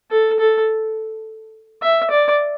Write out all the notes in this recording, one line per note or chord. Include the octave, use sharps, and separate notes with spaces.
A4
A4
E5
D5